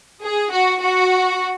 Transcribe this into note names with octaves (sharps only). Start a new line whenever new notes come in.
G#4
F#4
F#4